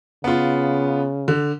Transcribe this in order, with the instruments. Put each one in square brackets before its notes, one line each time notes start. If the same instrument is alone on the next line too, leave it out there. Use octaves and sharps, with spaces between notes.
[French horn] C#3 [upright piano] B3 F4
[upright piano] D3